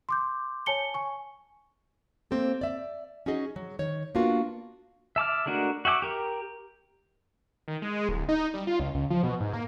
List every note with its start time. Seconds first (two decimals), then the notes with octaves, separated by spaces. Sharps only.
0.09 C6 D6 G6
0.66 C#5 G#5 A5 C#7 G7
0.94 G#5 C#6
2.31 A#3 C4 G4 A4
2.61 D5 E5
3.26 C#4 D#4 F#4 G#4 D#5
3.56 F#3
3.79 D#3 C#5
4.15 A#3 B3 D4 F4 F#4 A#4
5.16 E5 A5 D6 F6
5.46 G#3 A3 D4 F#4 A#4
5.85 F#4 E5 G5 D6
6.02 G4 A#4
7.68 D#3
7.82 G#3
8.09 D1
8.29 D#4
8.54 G3
8.67 F4
8.80 C#2
8.94 C#2
9.10 F3
9.23 B2
9.40 G#2
9.53 A#3